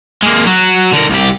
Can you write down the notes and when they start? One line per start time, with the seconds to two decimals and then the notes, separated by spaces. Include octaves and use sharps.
0.22 G#3 A#3
0.46 F#3 F#4
0.93 D3 A#4
1.10 C2 G4